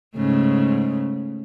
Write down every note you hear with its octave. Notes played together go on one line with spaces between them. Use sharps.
G#2 C#3 A3